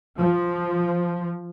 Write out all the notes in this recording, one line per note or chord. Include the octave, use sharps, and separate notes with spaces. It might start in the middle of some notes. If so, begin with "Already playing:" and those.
F3